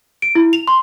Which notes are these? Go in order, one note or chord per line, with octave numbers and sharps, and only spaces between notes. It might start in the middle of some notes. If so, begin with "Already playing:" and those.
D7
E4
F7
C6